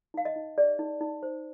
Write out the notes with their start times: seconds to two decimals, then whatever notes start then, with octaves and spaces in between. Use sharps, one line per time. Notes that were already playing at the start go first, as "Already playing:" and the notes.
0.14 D#4 F5
0.25 D#5
0.36 D#4
0.58 G#4 D5
0.79 D#4
1.01 D#4
1.23 C5